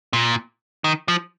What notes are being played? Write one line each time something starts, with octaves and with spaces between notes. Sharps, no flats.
A#2
D#3
F3